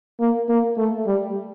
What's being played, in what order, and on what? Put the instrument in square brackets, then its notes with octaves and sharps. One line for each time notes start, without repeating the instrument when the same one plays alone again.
[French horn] A#3
A#3
A3
G3